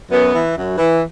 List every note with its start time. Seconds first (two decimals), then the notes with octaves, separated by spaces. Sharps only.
0.11 F#2 B3
0.33 E3
0.57 F#2
0.78 E3